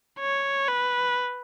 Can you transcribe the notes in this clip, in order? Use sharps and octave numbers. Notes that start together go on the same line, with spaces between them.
C#5
B4